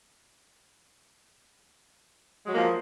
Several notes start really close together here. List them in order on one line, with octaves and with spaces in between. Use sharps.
G#3 F#3 A#3 F3